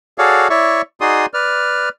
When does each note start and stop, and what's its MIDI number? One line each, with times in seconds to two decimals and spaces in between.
0.18 0.48 66
0.18 0.48 68
0.18 0.48 69
0.18 0.48 73
0.18 0.48 74
0.18 0.48 77
0.50 0.82 64
0.50 0.82 73
0.50 0.82 74
0.50 0.82 76
0.50 0.82 85
1.01 1.26 63
1.01 1.26 66
1.01 1.26 68
1.01 1.26 74
1.01 1.26 84
1.01 1.26 87
1.34 1.89 71
1.34 1.89 74
1.34 1.89 89